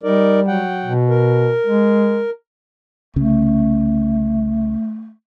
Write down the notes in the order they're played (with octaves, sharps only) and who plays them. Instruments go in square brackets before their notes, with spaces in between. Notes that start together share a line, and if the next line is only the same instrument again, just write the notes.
[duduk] G3 [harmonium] D#4 A#4 D5
[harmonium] F#3 F#5 G5
[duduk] B2
[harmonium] A#4
[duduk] G#3
[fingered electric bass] C2 C#3 C#4 [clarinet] A3